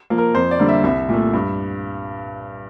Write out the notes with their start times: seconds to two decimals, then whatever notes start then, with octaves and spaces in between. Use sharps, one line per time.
0.10 F3 A#3
0.18 A#4
0.34 F2 C5
0.51 D5
0.59 D3 G3 A#3
0.68 E5
0.84 C2 E5
1.09 A#2 A3
1.33 G2